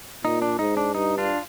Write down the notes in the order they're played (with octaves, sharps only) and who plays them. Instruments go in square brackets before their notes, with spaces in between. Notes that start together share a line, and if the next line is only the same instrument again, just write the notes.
[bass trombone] A#2 [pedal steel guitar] D#4
[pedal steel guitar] D4
[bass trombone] G#2 [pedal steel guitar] D#4
[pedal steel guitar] D4
[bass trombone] G2 [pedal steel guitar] D#4
[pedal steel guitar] D4 F4